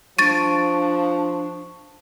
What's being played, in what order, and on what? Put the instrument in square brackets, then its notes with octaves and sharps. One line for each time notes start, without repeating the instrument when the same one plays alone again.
[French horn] F3 [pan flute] D4 [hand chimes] C#6 D7 [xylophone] A6 D#7